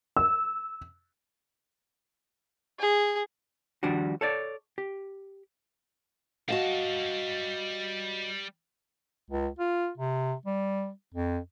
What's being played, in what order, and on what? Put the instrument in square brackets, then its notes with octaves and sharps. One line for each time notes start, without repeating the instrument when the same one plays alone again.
[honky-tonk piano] E6
[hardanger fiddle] G#4
[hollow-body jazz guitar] D#3 F3 G3 D4 F#4
A4 C#5 D5
G4
[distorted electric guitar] G3 A5 [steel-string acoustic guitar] F#4 D#5 F5
[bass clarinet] C#2
F4
C3
G3
F2